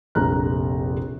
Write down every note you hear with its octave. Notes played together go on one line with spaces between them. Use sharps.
F1 A#1 A#5 F#6